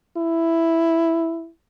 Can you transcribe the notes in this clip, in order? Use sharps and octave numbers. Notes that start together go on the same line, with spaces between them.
E4